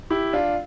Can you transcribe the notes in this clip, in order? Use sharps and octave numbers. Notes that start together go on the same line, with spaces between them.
E4 G4
D4 F4